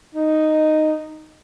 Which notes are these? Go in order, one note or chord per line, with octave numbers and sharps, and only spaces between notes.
D#4